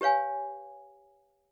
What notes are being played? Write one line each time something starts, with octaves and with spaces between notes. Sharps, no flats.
G4 B4 C#5 F5 G#5